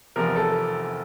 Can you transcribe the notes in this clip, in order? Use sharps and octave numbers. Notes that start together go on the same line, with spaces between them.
F1 E2 C3 F3 A#4
A4